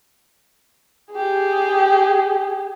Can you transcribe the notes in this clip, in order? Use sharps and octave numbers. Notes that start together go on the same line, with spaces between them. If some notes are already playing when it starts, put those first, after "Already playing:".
G4 G#4